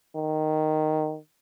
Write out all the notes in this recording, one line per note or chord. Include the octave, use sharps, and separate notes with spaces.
D#3